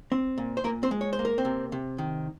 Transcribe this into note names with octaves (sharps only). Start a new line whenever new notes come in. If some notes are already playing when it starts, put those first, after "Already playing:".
C4
A#2
C5
A#2 A#3 A#4
C4 C5
G#3
C#5
C5
A#3
A#4
C4 C5
C3
C3
D#3